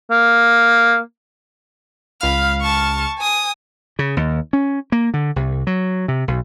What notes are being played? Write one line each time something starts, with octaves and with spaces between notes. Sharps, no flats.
A#3
C#2 F5 B5 F6
A5 C#6
G#5 D#6
C#3
D#2
C#4
A#3
D3
C2
F#3
C3
B1